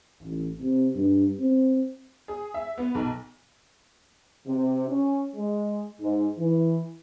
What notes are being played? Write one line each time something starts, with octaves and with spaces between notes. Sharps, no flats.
A1
C3
G2
C4
G#4
E5
B3
B1
C3
C#4
G#3
G#2
E3